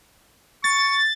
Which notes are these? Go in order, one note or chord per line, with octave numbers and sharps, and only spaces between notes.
C#6 A6